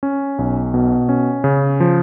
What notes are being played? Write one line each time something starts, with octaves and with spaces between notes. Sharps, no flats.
C#4
B1
B2
C#4
C#3
F3